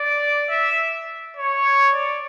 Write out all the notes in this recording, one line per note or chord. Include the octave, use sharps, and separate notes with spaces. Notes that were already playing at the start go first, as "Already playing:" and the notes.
Already playing: D5
E5
C#5
D5